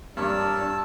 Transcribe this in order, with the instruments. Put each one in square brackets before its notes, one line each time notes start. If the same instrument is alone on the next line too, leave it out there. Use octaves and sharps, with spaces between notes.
[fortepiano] G2 [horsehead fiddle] D4 [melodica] A#4 C#5 D5 [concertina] A5 E6